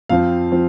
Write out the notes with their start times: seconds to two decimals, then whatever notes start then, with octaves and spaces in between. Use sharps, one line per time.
0.09 F2 F3 C4 F5
0.52 F3 C4